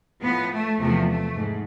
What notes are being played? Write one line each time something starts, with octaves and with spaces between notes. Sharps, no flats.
A2 F3 B3
A3
E2 C3 F3 A3
A3
G#2